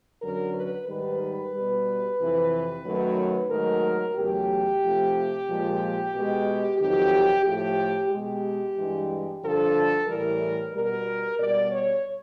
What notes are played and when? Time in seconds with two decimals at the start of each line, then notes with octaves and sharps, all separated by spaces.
0.21 F#2 D3 F#3 A#4
0.54 B4
0.87 G#2 D#3 G3 B4
1.53 B2 G3
2.19 F2 C3 E3
2.85 F#2 D#3 F#3 A3
3.50 G#2 D#3 F#3 A3 A#4
4.16 E2 C#3 F#3 A3 G4
4.82 C3 F3 A3
5.47 A#2 F3 G#3
6.12 B2 G#3
6.78 F2 C3 D#3 F#3 G4
7.44 A2 F3 A3 G4
8.09 B2 G#3 G4
8.75 G2 E3 G#3
9.41 G2 D3 F3 A4
10.07 A2 E3 G3 A#4
10.72 B2 G3 A#4
11.39 B2 G3 D5
11.72 C#5